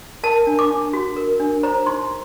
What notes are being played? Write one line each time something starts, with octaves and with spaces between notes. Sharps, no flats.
A#4 A5
D4
D6
D4
F#4
A#4
D4
C5 A#5
D#4 C6